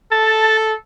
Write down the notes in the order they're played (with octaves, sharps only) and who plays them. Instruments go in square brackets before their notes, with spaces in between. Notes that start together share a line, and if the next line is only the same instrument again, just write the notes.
[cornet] A4 [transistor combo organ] A5